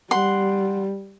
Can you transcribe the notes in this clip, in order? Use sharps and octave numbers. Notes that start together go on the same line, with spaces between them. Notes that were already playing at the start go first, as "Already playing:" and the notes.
G3 F#5 C6